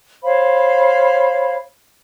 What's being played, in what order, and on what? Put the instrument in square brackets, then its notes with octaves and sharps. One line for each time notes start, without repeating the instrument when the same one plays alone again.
[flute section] C5 C#5 F5 B5